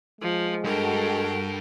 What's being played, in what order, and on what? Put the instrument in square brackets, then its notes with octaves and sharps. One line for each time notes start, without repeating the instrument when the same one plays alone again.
[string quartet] F3 [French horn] G#3
[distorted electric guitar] G2 [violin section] F#4 A4 [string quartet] A#4 G5